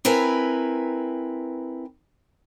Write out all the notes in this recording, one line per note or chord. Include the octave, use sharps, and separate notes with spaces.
C4 E4 A#4 B4 G#5 A#5